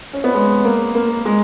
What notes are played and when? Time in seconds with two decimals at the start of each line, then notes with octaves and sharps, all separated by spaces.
0.13 C#4
0.24 B3
0.34 G#3
0.65 A#3
0.95 A#3
1.25 G#3